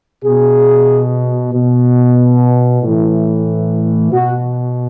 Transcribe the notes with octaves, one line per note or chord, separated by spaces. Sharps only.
B2 G#4
B2
A2 E3
B2 F#4